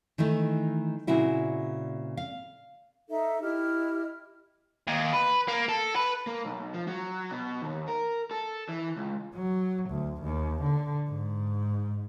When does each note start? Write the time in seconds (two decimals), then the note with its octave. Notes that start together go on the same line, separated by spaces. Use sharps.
0.18 D#3 E3 A3 D#4
1.07 A#2 C#3 C4 E4 F#4
2.17 F5
3.08 D#4 A4 E5
3.42 E4 G4 D#5 F6
4.88 D#2
5.13 B4
5.48 A#3
5.69 A4
5.96 B4
6.27 A#3
6.45 B1
6.74 F3
6.87 F#3
7.31 B2
7.62 D#2
7.88 A#4
8.31 A4
8.69 E3
8.97 C#2
9.34 F#3
9.90 D2
10.23 D#2
10.63 D3
11.09 G#2